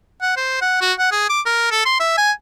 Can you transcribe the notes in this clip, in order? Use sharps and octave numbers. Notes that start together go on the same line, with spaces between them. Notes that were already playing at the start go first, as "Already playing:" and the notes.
F#5
C5
F#5
F#4
F#5
G#4
D6
A#4
A4
C6
E5
G#5